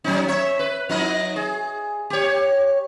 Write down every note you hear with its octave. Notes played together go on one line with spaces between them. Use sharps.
F#3 C#4 D#4
C#5 E5
B4
F#3 D#4 D#5
G#4
G4 C#5